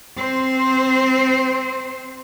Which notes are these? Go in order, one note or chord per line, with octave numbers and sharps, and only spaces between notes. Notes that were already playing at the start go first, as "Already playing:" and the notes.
C4 C5